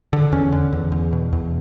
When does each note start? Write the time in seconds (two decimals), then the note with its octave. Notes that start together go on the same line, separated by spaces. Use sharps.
0.13 D3
0.32 E2 C#4
0.52 D3
0.72 E2
0.92 E2
1.13 B2
1.33 E2